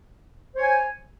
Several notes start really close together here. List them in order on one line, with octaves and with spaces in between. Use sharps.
C5 C#5 G#5